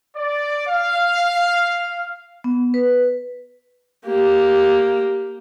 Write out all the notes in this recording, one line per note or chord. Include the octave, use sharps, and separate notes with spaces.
D5
F5
B3
B4
A#3 G4